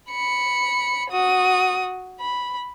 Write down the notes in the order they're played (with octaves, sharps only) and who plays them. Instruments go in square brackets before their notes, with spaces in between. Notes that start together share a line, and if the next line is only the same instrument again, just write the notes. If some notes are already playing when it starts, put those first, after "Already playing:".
[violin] B5 C#7
F#4 D#6
B5